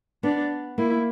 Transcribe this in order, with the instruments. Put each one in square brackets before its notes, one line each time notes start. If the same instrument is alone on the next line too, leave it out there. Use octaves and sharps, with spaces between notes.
[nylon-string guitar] B3 [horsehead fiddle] D4
[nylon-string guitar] A#3 [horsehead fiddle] E4